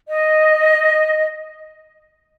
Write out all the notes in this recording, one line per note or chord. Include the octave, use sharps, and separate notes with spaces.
D#5